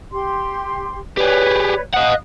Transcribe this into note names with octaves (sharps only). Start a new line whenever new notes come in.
G4 C6
G4 G#4 B4 C#5 D5
D#5 F5 F#5 D#6 F#6